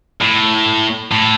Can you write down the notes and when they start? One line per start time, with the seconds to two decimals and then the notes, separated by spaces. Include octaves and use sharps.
0.21 A2
1.11 A2